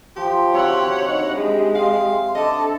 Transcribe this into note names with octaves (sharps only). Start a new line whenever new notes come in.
F3 G4 G5 C6
C3 F#3 E4 C#5 F#5
D4 D#4 D#5
G#3 G4
F5 G5 G#5 C6
D3 A4 D#5 A5 D6